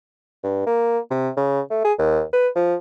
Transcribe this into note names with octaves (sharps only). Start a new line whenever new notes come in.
G2
A#3
C3
C#3
A3
G#4
D#2
B4
F3